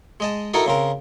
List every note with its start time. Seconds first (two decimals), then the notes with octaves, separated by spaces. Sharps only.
0.20 G#3 D#5 A5
0.54 D#4 E4 F#4 A4 A#4 D#5
0.66 C#3 C4 A#4